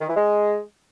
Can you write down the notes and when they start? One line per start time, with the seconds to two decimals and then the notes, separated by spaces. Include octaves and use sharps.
0.01 D#3
0.09 E3
0.16 G#3